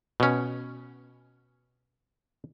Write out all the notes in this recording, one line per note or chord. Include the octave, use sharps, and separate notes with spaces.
B2 C#4